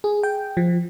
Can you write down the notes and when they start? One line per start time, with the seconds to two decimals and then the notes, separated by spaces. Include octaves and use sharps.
0.04 G#4
0.23 G5
0.57 F3